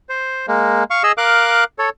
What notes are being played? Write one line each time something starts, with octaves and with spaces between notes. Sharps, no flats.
C5
G#3 A#3
F5 C#6
G#4 D#5 E6
A#4 F5 D6 F#6
A4 C#5